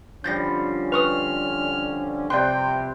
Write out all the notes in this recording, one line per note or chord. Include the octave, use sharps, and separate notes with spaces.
D3 F3 G3 C#4 G6 A6 A#6
B4 C#6 D#6 F6
C3 B4 C5 D5 G5 C6